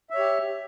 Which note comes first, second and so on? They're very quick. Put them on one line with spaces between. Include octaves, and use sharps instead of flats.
E5 C#5 G4